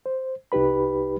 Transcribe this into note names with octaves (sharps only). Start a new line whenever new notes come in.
C5
C2 D#4 G4 B4 B5